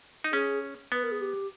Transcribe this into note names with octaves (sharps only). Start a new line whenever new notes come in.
D#4
C#4 G#4
B3 B4
A#4
G#4
G4